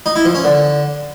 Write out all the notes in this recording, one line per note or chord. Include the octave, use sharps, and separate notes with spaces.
D#4
E4
F3
C#4
D3